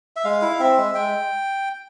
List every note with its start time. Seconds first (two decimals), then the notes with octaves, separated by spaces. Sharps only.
0.16 E5
0.24 G#3 F5
0.42 E4
0.59 C4 E5
0.78 G#3
0.95 G#3 G5